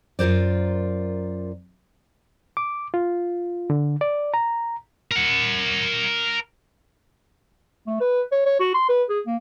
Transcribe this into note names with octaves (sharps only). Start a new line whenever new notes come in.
F#2 F4 A#4 C5 D5
D6
F4
D3
D5
A#5
A#4 F#5
A3
B4
C#5
C#5
F#4
C6
B4
G#4
A#3